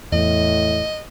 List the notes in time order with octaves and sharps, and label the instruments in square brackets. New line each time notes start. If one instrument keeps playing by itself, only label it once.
[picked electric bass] E2 [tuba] A2 [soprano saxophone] D#5